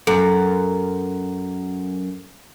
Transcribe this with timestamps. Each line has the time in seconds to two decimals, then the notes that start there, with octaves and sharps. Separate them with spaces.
0.07 F#2 A4